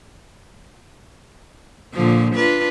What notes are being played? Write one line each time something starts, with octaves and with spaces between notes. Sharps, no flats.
A#2 D3 F3
D4 F4 B4